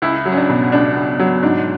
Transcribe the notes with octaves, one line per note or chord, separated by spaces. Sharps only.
C#2 E4
F#3
C#4
D4
B2
C#2 D4
C#2
F#3
G#2 D4